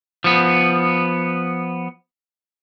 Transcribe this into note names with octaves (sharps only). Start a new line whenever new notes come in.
F3 B3